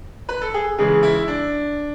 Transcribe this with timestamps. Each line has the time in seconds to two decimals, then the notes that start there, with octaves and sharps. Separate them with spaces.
0.29 B4
0.42 A4
0.54 G#4
0.78 C#3 E3 G#3 G#4
1.03 E4
1.28 D4